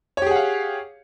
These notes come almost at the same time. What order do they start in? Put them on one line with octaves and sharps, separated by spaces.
C#5 G4 G#4 F#5 F5